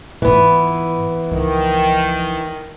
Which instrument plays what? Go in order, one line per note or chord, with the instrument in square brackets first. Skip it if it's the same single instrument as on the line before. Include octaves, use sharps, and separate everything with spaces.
[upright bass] G#2 F4 [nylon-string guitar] E3 B3
[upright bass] C#2 F3 [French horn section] D#3